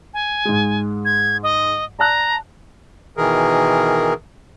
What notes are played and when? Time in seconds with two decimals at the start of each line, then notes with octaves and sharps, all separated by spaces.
0.14 G#5
0.45 G#2 G#3
1.05 G#6
1.43 D#5
1.99 D5 A5 A#5 F#6
3.17 B2 D#3 E3 G#4 A#4